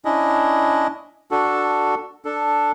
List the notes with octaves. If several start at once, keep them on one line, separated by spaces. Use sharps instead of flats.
C#4 D4 E4 D#5
D4 F#4 A4
D4 A4